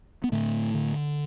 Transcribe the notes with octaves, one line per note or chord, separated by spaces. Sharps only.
B3
A2 D3 A3
D3